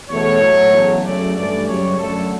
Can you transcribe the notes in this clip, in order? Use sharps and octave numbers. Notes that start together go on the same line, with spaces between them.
E2 B2 A3 C#5
A2 F#3 A3
E2 C#3 F#3 A3
F#2 C#3 F#3 A3 D5
G2 E3 A3 D5
F#2 C#3 G3 C#5
F#2 D3 A3 A4